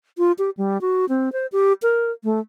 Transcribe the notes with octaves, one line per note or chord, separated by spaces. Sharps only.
F4
G4
G3
F#4
C4
C5
G4
A#4
A3